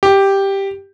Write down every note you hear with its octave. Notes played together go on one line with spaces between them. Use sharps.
G4